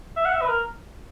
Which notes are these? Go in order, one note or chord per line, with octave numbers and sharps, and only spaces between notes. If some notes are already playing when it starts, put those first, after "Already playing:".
E5
F#5
E5
B4
A#4